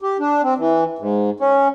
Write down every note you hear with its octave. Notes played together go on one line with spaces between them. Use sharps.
G4
D4
C4
E3
G#2
C#4